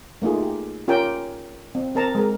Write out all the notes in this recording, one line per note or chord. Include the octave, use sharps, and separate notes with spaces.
A3 A#3 D#4 F4 G#4
G4
C#4 F4 G4 A#4 G5 G#5
C4
C4 A#4 A5 A#5
G#3 A#4